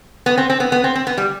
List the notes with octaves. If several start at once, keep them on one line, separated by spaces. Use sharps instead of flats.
B3
C4
C4
B3
B3
C4
C4
B3
G3